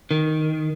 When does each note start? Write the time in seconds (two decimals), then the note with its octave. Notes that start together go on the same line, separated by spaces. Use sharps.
0.11 D#3